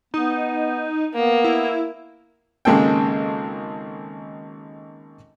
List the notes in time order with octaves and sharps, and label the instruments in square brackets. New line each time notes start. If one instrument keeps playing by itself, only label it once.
[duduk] B3 [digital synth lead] D#4
[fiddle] A#3 [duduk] B3
[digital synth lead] E4
[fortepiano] G#1 C#3 G#3 A#3 A4 G5